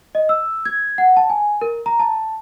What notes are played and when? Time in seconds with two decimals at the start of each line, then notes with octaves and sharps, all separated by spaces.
0.15 D#5
0.29 E6
0.65 G#6
0.98 F#5
1.17 A5
1.30 G#5
1.61 A#4
1.86 A#5
1.99 A5